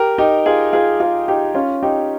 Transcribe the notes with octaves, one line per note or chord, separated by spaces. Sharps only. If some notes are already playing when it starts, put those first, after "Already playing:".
Already playing: G4 A#4
D#4 G4
F4 G#4
F4 G#4
F4 G#4
D#4 G4
C#4 F4
D#4 G4